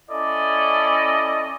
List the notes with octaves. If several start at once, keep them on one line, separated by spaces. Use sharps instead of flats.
C#4 E4 A4 D5 D#5